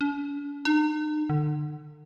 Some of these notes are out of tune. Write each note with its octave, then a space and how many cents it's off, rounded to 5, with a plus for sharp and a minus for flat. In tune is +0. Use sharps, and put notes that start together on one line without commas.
D4 -45
D#4 -40
D3 +30